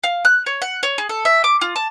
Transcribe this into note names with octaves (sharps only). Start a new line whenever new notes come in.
F5
F#6
C#5
F#5
C#5
G#4
A4
E5
D6
F4
A5